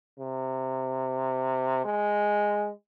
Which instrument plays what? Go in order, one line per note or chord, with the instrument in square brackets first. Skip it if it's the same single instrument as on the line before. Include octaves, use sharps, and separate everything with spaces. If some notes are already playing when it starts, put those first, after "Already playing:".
[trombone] C3
G#3